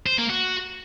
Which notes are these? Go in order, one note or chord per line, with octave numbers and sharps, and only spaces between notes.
C5
A#3
F#4